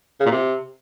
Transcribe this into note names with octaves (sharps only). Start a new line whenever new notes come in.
C#3
A#2
C3